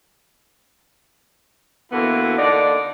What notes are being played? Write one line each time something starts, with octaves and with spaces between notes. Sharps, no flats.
D3 E3 A#3 B3 E4 F#4
D3 A#3 D#4 D5